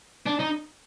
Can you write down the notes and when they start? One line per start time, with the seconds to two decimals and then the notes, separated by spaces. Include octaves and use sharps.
0.26 D4
0.39 D#4